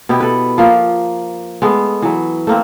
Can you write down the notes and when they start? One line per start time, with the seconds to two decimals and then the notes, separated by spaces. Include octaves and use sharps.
0.09 B2 B3 E4 G4
0.20 A4 B4
0.58 F3 A#3
1.62 G#3 A3 B3
2.02 E3 F#3
2.47 A3 A#3 C4